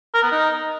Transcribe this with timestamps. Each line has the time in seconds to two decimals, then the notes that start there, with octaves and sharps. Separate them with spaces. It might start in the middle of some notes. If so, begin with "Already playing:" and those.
0.14 A#4
0.23 B3
0.32 D#4